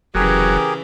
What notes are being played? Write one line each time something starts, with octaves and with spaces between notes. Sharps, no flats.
F1 C#3 E3 F#3 G4 G#4 A#4